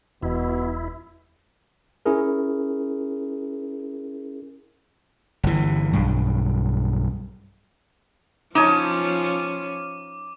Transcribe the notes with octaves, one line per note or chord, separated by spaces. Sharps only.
E1 B2 E4
C#4 E4 G#4 A#4
G1 E3
B1 G2
F3 C#4 D#4 F4 C#5 A5 D6 D#7